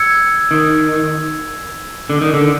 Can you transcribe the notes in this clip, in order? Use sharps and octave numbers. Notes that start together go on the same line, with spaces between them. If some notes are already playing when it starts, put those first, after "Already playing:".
Already playing: E6 G#6 C#7
D#3
D3
D#3
D3